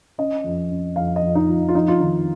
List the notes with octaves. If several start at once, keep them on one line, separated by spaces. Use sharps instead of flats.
C#4 D#5
F2
C#4
F2 F5
D#5
F2
D#4
F3
F4
F2 D#4
F4
D#3 D#4